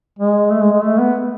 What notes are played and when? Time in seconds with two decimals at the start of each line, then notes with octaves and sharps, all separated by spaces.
0.19 G#3
0.51 A3
0.62 G#3
0.73 G#3
0.83 A3
0.99 B3